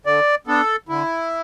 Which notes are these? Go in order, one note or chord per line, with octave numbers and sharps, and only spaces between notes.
D3 D5
B3 D4 A4
D3 E4